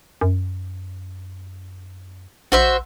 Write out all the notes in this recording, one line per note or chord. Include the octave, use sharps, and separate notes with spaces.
F#2
A#1 F#4 C5 E5